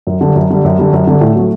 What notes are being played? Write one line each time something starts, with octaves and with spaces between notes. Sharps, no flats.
F#2
D3 G3
F#2
D3 G3
F#2
D3 G3
F#2
D3 G3
A2
F#3 A3